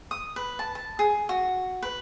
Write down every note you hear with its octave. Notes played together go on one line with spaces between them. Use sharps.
D#6
B4
A5
A5
G#4
F#4
B4